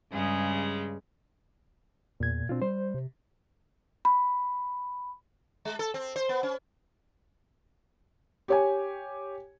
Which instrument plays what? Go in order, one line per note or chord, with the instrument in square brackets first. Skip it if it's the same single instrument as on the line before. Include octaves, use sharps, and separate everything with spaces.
[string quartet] G2 C#3 G#3
[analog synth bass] E2 [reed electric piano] A#2 G#6
[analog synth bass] B2 [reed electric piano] C4 D4 F4
[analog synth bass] G3 [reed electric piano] C5
[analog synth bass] C3
[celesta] B5
[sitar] G#3
A4
C4
C5
B3
C#4
[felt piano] G4 C#5 G#5